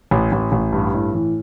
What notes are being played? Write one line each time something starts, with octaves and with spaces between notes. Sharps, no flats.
A1
A1
A1
G2
A2
E3